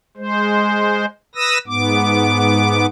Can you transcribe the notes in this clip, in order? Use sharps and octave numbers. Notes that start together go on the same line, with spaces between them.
G#3 C5
B4 D#6 E6 A#6
G#2 B3 D6